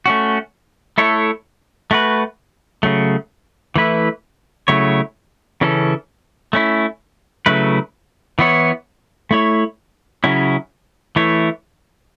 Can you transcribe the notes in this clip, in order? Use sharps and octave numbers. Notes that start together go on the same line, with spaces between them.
A3 C#4 F#4
A3 E4 A4 C#5
A3 F#4 B4
C#3 F#3 A3
E3 A3 E4 B4
C#3 F#3 A3 E4 C#5
C#3 E3 C#4 A4
A3 C#4 E4
C#3 F#3 A3 E4 B4
E3 B3 E4 C#5
A3 E4 C#5
C#3 F#3 C#4 E4
E3 A3 E4 C#5